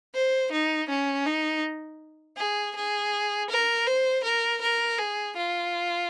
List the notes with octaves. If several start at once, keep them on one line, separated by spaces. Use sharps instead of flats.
C5
D#4
C#4
D#4
G#4
G#4
A#4
C5
A#4
A#4
G#4
F4